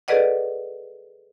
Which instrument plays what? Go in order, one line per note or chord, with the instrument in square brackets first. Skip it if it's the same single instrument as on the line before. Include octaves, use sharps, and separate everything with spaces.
[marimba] G#4 A4 B4 D5 D#5 F#5